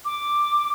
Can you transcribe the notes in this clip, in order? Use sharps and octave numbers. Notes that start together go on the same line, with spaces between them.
D6